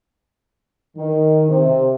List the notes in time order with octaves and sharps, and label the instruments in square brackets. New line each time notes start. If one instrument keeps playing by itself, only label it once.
[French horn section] D#3
C3